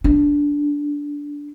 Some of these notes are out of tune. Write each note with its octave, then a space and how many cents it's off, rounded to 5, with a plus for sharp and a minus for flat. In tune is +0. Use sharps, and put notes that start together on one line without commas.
D4 -15